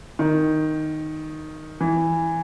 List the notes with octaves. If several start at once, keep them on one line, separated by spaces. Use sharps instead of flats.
D#3
E3